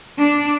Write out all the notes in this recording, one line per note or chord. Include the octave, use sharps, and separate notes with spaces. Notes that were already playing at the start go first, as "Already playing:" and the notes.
D4